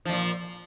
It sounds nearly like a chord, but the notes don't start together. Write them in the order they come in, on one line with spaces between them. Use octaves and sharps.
F3 F2 A#2